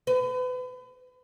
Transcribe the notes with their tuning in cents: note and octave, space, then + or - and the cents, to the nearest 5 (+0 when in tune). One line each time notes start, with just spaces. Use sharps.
B4 +35